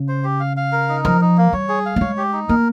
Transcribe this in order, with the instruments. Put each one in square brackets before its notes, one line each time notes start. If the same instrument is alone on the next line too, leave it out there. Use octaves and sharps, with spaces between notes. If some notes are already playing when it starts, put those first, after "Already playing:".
Already playing: [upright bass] C#3
[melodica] C5
G4
F5
F5
A#4
D#4
[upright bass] F3 [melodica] A#4
[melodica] D#4
A#3
[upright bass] G3 [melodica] C#5
[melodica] G#4
F5
[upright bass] A#3
[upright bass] G#3 [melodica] C#5
[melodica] G4
D#4
[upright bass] A#3 [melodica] A#4